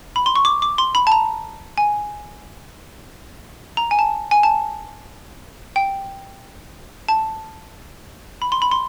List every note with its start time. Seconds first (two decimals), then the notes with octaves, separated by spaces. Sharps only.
0.16 B5
0.26 C6
0.36 C#6
0.45 D6
0.62 D6
0.78 C6
0.95 B5
1.07 A5
1.12 A#5
1.78 G#5
3.77 A#5
3.91 G#5
3.99 A5
4.31 G#5
4.43 A5
5.76 G5
7.09 A5
8.42 B5
8.52 C6
8.62 B5
8.71 C6